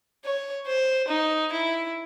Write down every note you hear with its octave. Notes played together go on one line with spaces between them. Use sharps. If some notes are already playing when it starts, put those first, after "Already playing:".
C#5
C5
D#4
E4